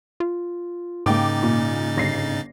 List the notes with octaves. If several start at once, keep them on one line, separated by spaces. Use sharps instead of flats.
F4
G#2 C#3 A#3 D#4 G5 D6 A6
A#2
G1 A#6 C7